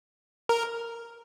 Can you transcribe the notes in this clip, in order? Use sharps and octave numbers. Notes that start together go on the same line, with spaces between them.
A#4